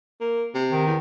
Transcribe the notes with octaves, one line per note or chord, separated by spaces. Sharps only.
A#3
C3
D#3
E2